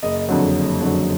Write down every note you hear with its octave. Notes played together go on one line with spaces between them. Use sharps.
F#1 D#5
F2 D3 F#3
F#1
F2 D3 F#3